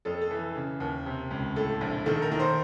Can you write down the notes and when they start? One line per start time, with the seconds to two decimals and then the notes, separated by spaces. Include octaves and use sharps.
0.05 F2 A4
0.21 A4
0.31 E3
0.56 C#3
0.80 D#2
1.06 C3
1.31 C#2
1.56 A2 A4
1.81 A#1
2.06 D#3 A4
2.22 A#4
2.31 D#3
2.40 C5